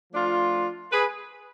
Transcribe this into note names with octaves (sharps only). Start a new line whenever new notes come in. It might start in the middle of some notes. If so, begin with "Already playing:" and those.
F3 A3 D4 F4
G#4 B4